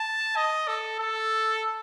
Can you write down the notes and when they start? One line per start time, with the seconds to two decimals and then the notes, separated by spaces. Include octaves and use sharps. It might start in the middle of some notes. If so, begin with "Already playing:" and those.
Already playing: A5
0.36 D#5
0.68 A4
0.99 A4